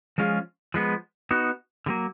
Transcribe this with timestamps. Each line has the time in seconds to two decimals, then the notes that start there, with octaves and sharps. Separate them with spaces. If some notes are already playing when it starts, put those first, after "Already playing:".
0.18 F3 G#3 C#4 F4 G#4
0.74 F3 G#3 B3
1.31 B3 D#4 F#4
1.86 D3 F#3 A#3